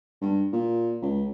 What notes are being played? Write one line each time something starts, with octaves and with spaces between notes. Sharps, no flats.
G2
A#2
C#2